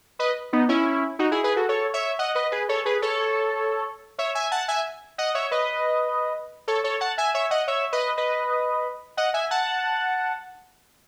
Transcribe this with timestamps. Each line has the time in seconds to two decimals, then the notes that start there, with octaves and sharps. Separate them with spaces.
0.19 B4 D#5
0.53 B3 D#4
0.69 C#4 E4
1.19 D#4 F#4
1.31 E4 G#4
1.44 G#4 B4
1.56 F#4 A4
1.69 A4 C#5
1.94 C#5 E5
2.19 D#5 F#5
2.35 B4 D#5
2.52 G#4 B4
2.69 A4 C#5
2.85 G#4 B4
3.02 A4 C#5
4.18 C#5 E5
4.35 E5 G#5
4.51 F#5 A5
4.68 E5 G#5
5.18 D#5 F#5
5.35 C#5 E5
5.51 B4 D#5
6.68 A4 C#5
6.84 A4 C#5
7.00 F#5 A5
7.18 E5 G#5
7.34 C#5 E5
7.51 D#5 F#5
7.67 C#5 E5
7.92 B4 D#5
8.17 B4 D#5
9.17 D#5 F#5
9.34 E5 G#5
9.51 F#5 A5